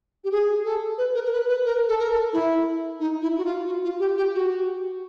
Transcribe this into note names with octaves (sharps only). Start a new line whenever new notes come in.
G4
G#4
A4
B4
A#4
A#4
B4
B4
A#4
A4
A#4
A4
E4
D#4
E4
F#4
F4
F#4
F4
G4
G4
F#4